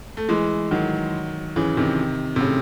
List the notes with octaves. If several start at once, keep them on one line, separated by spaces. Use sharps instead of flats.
A3
E3 G#3
D#3 F#3
C#3 E3
C3 D#3
C3
A2 C#3